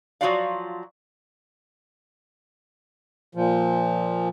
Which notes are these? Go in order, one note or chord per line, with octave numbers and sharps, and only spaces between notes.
F3 F#3 F4 F#4 D5 F5
A#2 F3